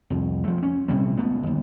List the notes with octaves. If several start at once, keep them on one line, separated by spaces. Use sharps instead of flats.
C2 F2
F3 A3
C#4
A#1 C3 G3 A3
C#2 A3 B3
G1 D#2